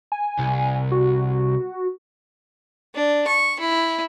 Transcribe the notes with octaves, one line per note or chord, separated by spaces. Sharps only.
G#5
C2
F#4
D4
C#6
E4